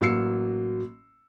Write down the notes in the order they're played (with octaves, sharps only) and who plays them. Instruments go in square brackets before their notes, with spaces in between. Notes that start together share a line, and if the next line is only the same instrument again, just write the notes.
[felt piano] A1 F#3 A#3 E6 C7 C#7